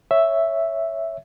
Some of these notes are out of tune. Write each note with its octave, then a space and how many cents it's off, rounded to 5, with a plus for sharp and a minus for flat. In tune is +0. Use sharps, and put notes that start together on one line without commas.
C#5 +0 E5 +0